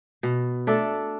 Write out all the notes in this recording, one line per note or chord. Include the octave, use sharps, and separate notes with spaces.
B2
A3 D4 A4